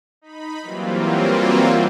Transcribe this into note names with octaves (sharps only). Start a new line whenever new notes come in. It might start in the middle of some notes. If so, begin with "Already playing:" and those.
D#4 B5
E3 F#3 G3 A#3 C4 F4